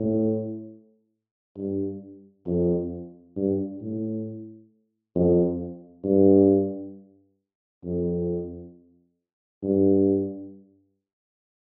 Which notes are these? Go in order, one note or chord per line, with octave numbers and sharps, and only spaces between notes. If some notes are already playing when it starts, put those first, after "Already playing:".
Already playing: A2
G2
F2
G2
A2
F2
G2
F2
G2